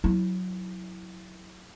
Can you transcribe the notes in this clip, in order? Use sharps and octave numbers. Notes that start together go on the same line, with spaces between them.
F#3 E4